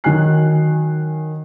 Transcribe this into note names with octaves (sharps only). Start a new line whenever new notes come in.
D#3 F#3 F#4 G#5 F#6 C7